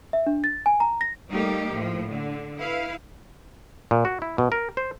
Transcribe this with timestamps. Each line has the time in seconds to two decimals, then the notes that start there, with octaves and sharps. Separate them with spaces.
0.13 E5
0.26 D4
0.44 A6
0.66 G#5
0.80 A#5
1.01 A#6
1.29 G3 A3 A#3 D#4 G4
1.72 A2 F3
2.10 D3
2.57 E4 B4 F5
3.91 A#2
4.05 F#4
4.22 E4
4.38 B2
4.52 A#4
4.77 C5